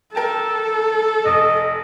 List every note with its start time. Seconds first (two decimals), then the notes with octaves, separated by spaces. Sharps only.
0.15 A4 A#4 G5 A5
1.26 F1 D#5